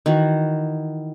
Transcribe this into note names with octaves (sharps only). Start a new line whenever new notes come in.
D#3 E3 F#4